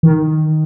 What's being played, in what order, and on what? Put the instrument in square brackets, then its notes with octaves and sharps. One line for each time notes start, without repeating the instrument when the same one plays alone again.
[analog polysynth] D#3